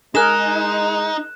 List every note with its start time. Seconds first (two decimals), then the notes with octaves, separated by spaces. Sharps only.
0.15 G#3 D#4 G#4 A#4 F#6 E7